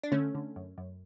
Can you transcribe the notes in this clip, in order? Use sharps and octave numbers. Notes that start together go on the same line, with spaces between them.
D4
D3 A3 C#4
D3
F#2
F#2